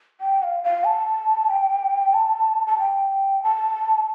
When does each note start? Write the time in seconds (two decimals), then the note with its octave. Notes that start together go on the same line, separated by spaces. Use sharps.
0.21 G5
0.43 F5
0.64 F5
0.85 A5
1.50 G5
2.14 A5
2.67 A5
2.79 G5
3.43 A5